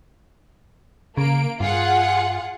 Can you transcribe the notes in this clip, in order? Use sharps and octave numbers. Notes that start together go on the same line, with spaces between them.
C#3 A#3 D7
G2 F4 G#4 F#5